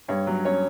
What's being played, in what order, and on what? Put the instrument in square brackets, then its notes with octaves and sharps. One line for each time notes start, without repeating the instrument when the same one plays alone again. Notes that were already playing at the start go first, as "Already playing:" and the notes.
[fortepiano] G2 C#5
F#3
C#4 C#5